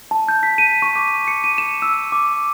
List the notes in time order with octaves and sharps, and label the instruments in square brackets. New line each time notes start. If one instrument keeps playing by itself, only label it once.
[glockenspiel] A5
G6
B6
D#7
C#6
D6
C#7
D#7
E7
E6
D6